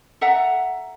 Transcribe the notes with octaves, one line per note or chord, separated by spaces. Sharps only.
A4 E5 F#5 A#5